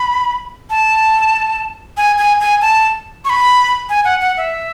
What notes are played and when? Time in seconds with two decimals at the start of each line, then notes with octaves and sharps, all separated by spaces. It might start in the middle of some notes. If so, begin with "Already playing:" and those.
Already playing: B5
0.70 A5
1.97 G#5
2.18 G#5
2.40 G#5
2.61 A5
3.25 C#6
3.30 B5
3.90 G#5
4.05 F#5
4.21 F#5
4.37 E5